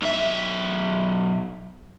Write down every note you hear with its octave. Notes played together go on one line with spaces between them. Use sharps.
B1 E5